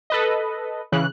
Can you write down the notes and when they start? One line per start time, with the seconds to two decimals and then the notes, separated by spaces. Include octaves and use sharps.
0.10 A4 B4 D#5
0.92 C#3 E3 F#6